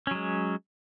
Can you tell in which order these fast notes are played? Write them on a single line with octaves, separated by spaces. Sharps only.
C#4 F#3 G#3